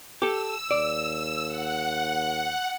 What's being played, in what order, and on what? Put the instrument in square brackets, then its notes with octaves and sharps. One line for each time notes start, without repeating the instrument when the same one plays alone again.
[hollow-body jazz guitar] G4 A4 [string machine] E6
[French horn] D#2 [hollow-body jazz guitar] D5
[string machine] F#5